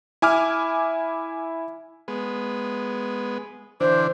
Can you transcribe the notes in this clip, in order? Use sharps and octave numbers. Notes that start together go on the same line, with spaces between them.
E4 G#5 D6 F6
G#3 B3
D3 E3 D4 C5